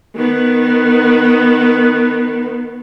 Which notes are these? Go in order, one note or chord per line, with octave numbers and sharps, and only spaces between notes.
D#3 B3